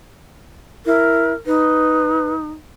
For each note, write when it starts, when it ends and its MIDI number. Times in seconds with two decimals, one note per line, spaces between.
0.86 1.33 64
0.86 1.33 70
1.46 2.48 63
1.46 2.34 71